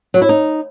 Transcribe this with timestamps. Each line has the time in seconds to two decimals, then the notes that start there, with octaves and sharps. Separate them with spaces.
0.14 F#3
0.22 E4
0.29 D#4